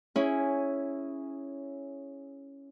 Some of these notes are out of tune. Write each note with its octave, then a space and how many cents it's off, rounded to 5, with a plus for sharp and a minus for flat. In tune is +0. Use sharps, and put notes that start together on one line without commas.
C#4 +0 E4 +0 G#4 +0